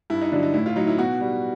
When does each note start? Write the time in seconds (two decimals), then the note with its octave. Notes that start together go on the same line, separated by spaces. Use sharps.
0.10 G2 E4
0.21 D#4
0.32 D3 F#3 D4
0.43 D#4
0.54 A2 E4
0.66 F4
0.76 F#3 D#4
0.87 E4
0.98 B2 F#4
1.21 G3